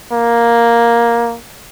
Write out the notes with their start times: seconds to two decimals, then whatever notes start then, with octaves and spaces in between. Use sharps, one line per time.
0.12 A#3